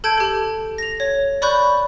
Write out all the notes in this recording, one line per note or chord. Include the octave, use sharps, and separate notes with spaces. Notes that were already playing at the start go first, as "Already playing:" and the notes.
A4 A5 G6 G#6 D7
G4 A4
A#6 F7
C#5
D5 B5 C#6 F#6 G6